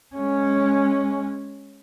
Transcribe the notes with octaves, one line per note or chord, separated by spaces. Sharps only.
G#3 C#4